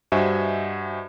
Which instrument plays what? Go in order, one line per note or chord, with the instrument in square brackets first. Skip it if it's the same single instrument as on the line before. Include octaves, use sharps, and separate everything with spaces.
[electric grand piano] G2 F#4 C5 D#5 E5 G#5